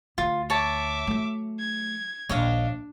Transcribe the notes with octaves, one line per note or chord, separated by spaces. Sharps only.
D2 F4
C#5 E5 A5 D6
F#3 A3
G#6
A#1 D#2 D4 C#5 D#5 F5